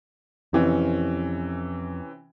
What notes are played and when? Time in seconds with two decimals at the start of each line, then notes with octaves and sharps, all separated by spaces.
0.53 F2 C3 E3 C#4